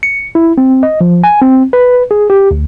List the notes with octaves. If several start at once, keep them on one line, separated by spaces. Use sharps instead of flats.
C#7
E4
C4
D#5
F3
G#5
C4
B4
G#4
G4
D2